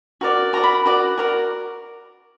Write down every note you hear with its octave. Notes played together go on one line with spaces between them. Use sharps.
F#4 A#4 D5
F#4 A#4 D5 A#5
B5
F#4 A#4 D5
F#4 A#4 D5